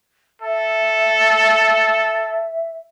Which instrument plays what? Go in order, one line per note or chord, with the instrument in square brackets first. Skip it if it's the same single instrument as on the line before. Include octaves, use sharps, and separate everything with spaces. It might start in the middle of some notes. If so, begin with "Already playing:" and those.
[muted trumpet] A4 [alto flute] E5